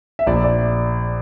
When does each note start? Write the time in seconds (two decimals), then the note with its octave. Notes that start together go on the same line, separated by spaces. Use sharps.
0.19 E5
0.26 A#1 D5
0.44 D5